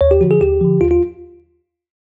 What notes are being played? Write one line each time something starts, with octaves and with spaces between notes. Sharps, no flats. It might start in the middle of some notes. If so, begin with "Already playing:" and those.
D#2 C#5
G4
D3 F3 F#4
G#4
D#2 G4
D3 F3
D#2 F4
F4